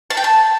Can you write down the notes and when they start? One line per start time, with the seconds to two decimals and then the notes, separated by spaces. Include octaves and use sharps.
0.10 A5
0.17 G5
0.24 A5